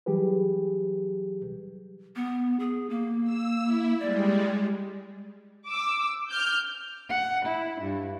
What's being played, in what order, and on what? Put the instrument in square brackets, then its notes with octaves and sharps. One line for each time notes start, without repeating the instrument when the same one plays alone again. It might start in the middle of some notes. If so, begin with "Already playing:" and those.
[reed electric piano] E3 F#3 G3 G4 G#4 B4
[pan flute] B3
G#4
A#3
[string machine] E6
E4
[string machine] G3 G#3 [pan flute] D5
[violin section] D6 E6
F6 G6
[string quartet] F#5
E4
G2